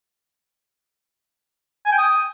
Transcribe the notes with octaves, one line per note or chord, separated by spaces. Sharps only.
G#5
G5
D#6